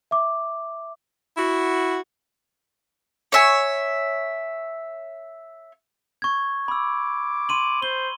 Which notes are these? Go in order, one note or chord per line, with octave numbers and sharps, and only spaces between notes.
E5 D6
E4 F#4
C#5 E5 G#5
C#6 G#6
B5 D6 E6
C6 D#7 F#7
C5 G7